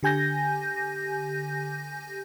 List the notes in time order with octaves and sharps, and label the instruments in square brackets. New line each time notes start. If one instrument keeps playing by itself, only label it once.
[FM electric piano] D3 G4 G#5 G6 A#6